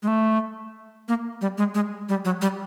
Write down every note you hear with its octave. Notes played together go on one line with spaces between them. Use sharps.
G#3
A3
A#3
G3
G#3
G#3
G3
F#3
G3